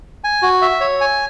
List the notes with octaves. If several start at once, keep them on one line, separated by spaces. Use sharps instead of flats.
G#5
F#4
E5
C#5
G#5